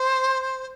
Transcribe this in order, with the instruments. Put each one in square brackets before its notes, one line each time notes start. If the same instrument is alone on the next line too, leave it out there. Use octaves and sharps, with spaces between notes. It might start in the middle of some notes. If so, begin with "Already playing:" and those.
Already playing: [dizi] C5